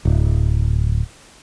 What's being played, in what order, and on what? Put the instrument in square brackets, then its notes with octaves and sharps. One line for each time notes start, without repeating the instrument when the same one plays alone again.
[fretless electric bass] D1